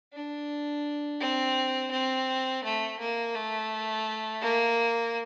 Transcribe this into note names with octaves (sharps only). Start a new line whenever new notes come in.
D4
C4
C4
A3
A#3
A3
A#3